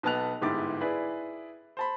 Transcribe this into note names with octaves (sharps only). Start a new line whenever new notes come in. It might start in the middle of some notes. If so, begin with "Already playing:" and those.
B1 B3 D#5 A5 F#6 F7
G1 G#2 E4 G4 D6 A6
E4 G#4 B4 D5
C5 A5 B5